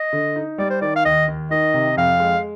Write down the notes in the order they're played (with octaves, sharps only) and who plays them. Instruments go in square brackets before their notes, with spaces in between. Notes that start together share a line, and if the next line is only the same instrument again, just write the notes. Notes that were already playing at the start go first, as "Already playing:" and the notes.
Already playing: [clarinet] D#5
[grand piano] D3
D#4
[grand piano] G3 [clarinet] D5
[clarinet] C5
[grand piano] D#3 [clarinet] D5
[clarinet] F5
[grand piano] D#2 [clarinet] D#5
[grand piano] D#2
[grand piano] D#3 [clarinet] D#5
[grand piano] C3
[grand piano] F2 [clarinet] F5
[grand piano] G#3